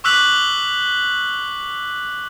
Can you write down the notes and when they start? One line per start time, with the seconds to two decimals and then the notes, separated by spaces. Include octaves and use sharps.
0.04 C#6 D6 E6 F#6 B6 F#7